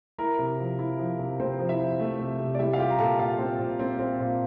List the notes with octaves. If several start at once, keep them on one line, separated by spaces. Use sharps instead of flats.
E4 A#4 A#5
C3
F3
E4
F3
C3
C3 C4 C5
F3
E4 E5
F3
A3
C3
C3
D5
G3 E4 E5
F5
F4 G4 G5
A#5
A#2 A4 A5
F4 F5
C4
A#2
C4
C4
A#2